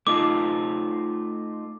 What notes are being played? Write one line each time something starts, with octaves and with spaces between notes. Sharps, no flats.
A3 D#4 F4 D6